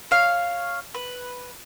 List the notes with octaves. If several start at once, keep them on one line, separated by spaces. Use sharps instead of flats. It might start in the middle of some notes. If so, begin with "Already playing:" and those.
C#5 F5
B4